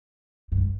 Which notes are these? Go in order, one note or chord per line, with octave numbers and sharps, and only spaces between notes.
G2